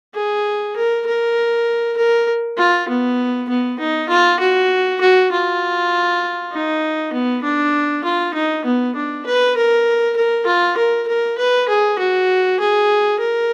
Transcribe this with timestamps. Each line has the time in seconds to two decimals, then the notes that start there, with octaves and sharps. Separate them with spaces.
0.15 G#4
0.77 A#4
1.06 A#4
1.97 A#4
2.58 F4
2.88 B3
3.49 B3
3.79 D#4
4.09 F4
4.40 F#4
5.01 F#4
5.32 F4
6.53 D#4
7.13 B3
7.43 D4
8.04 F4
8.34 D#4
8.65 B3
8.96 D4
9.26 B4
9.57 A#4
10.16 A#4
10.47 F4
10.77 A#4
11.08 A#4
11.38 B4
11.68 G#4
11.99 F#4
12.60 G#4
13.19 A#4